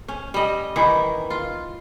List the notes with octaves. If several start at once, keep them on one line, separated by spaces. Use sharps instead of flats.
C#4
G3 D#5
D#3 E3 E4
F4